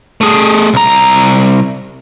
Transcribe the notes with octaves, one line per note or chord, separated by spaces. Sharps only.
A3 G#4
C2 A#5